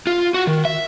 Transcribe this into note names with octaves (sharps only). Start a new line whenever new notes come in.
F4
F#4
D#3
E5